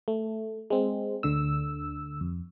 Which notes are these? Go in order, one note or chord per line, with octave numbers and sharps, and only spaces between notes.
A3
G#3 C4
D2 D3 E6
F2